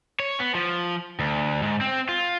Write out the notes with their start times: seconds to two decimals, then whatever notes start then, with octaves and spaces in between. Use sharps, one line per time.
0.20 C#5
0.40 B3
0.55 F3
1.20 D2
1.62 G#2
1.81 C4
2.09 F4